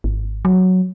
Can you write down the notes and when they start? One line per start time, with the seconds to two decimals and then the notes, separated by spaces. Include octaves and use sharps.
0.04 G#1
0.45 F#3